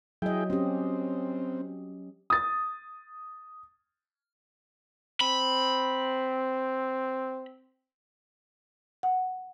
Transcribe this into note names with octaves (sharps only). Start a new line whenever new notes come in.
F#3 E4 G#4 D#5 G5
C4 C#4 G4
D#6 A6
C4 B5
F#5